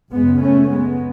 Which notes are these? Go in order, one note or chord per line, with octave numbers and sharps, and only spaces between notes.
F#2 C#3 G#3 B3
A3 C#4
G#3 B3